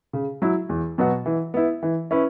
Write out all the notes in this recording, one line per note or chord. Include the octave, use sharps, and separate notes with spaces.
C#3
F#3 E4
E2
B2 F#3 B3 F#4
E3
B3 E4
E3
C#4 E4 B4